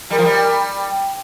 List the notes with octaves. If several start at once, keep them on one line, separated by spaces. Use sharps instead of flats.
G3 A#4
F3
G3